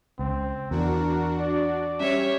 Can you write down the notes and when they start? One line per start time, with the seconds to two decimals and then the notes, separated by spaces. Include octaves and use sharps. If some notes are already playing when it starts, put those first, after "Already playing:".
0.19 C#2 C4
0.71 E2 D4 F#4 A#4
1.40 D5
1.99 G3 C#4 G4 C#5 E5